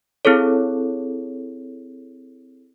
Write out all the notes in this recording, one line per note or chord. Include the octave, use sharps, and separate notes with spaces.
C4 E4 G#4 A4 C#5